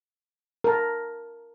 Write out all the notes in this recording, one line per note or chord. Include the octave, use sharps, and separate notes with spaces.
A#4 A5